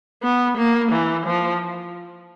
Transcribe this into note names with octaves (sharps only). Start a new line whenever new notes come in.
B3
A#3
E3
F3